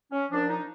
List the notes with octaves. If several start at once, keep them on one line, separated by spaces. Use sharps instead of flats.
C#4
A#2 F3 D4
D#4